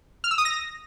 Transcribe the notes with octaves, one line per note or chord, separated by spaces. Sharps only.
F6
E6
D#6
A#6